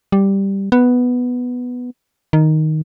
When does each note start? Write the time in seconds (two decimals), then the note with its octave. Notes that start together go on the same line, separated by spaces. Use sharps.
0.12 G3
0.72 B3
2.33 D#3